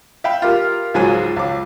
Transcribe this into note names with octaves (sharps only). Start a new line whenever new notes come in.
E5 F5 G5 B5
F4 G4 A#4
C#2 G#2 F3 F#3 G#4 G#5
C#2 D6